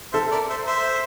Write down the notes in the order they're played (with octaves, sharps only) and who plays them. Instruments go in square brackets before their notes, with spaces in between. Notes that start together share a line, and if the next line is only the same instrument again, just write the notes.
[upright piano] A4 [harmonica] C5 E5
[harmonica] A#4 D5
C5 E5
C5 E5